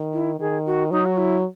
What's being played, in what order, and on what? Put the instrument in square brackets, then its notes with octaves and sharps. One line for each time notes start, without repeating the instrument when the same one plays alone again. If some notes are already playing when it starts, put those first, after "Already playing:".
Already playing: [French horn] D#3
[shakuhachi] E4
[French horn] D#3 [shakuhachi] G#4
[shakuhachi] F#4
[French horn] F#3 [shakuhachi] D#4
[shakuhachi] F#4
E4